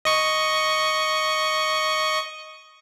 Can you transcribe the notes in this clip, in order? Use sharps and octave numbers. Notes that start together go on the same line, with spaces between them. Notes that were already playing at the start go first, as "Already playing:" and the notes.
D#5 C#6